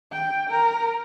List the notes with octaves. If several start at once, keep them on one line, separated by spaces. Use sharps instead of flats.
G5
A#4